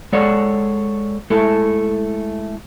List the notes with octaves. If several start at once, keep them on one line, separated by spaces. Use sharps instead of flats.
G#3 G#4 A4 C#5 D5 F#5
G#3 A3 E4 A4